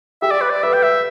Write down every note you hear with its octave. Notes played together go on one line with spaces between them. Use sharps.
G4 E5
D5
B4
D5
B4 E5
G5
E5